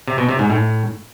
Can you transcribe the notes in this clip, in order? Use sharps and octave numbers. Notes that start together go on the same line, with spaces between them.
C3
B2
C3
G#2
A2